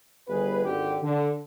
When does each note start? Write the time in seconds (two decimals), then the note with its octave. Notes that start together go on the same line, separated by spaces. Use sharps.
0.29 G1 G#4 B4
0.65 G#1 D3 G4
1.02 D3